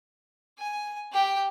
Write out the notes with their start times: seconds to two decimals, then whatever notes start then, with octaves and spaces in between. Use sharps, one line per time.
0.59 G#5
1.12 G4 G5